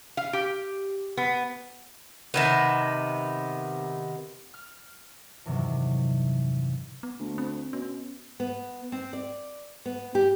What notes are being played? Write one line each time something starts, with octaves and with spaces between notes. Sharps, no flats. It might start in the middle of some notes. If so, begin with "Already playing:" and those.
F5
G4
B3
C3 D#3 B3
F6
E2 G2 C3 D#3 E3 F#3
B3
D2
C4
B2 C#4
B3
C4
D5
B3
G4